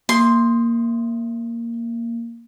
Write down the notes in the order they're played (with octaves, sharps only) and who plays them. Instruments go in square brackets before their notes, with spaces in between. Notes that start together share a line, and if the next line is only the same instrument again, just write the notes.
[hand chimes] A#3 [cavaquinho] C6